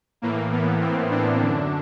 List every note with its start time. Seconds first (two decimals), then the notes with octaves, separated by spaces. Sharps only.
0.22 A2 E3 A#3
0.52 B3
0.81 C4
1.10 D4
1.40 F#2 D3